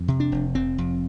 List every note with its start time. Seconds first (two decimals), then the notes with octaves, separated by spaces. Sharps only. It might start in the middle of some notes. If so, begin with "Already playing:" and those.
Already playing: F2
0.08 C3
0.20 D4
0.32 F1
0.55 F1 C4
0.78 F2